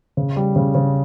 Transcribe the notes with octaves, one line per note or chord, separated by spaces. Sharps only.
C#3
G3
C#3
C#3